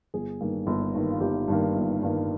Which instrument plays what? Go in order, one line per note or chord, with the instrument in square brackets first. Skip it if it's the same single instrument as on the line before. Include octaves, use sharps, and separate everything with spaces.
[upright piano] G1 G#4
G2 D#3 A#3
G1
G2 D#3 A#3
F4
G1 G4
G2 D#3 A#3
G1
G2 D#3 A#3